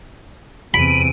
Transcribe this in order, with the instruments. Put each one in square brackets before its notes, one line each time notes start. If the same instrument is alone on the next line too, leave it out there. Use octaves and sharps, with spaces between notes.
[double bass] E2 C3 [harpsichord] B5 [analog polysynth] D7 D#7